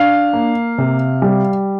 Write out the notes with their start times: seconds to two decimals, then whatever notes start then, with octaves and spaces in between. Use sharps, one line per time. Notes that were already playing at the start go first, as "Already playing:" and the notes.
Already playing: D4 F5
0.33 A#3
0.78 C3
1.22 G3